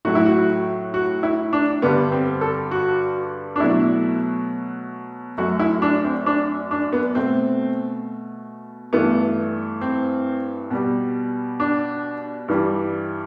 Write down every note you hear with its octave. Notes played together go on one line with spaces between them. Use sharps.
A2 F#3 A3 F#4
E4
F#4
F#4
E4
D4
G2 D3 G3 B3
C4
A4
F#4
D4
B2 F#3 A3 E4
F#2 F#3 A3 F#4
E4
D4
C4
D4
D4
B3
B2 A3 C4
G2 E3 A3 B3
C4
B2 G3
D4
G2 E3 G3